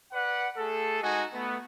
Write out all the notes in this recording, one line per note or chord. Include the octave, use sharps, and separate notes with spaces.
B4 D5 F#5
A3 G#4 A4
G#3 D#4 F#4 D#5 G#5
A3 B3